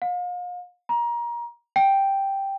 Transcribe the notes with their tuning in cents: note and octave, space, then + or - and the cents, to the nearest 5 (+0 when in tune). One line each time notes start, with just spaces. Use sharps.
F5 +40
A#5 +25
G5 +0